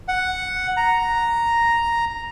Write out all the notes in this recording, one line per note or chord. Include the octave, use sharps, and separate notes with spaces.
F#5
A#5